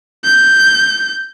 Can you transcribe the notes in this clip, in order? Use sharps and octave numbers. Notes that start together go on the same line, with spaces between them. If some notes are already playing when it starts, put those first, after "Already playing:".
G6